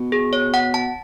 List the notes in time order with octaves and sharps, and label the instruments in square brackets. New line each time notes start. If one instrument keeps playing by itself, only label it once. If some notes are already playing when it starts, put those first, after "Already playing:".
Already playing: [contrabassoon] B2
[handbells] G#4
C#5
F#5
A5